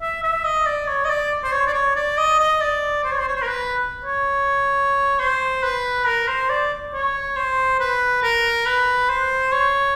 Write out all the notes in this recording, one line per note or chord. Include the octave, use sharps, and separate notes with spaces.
E5
E5
D#5
D5
C#5
D#5
D5
C5
C#5
D5
C#5
D5
D#5
D#5
D5
C5
C#5
C5
C#5
C5
A#4
B4
C#5
C5
B4
A#4
C5
D5
C#5
C5
B4
A#4
B4
C5
C#5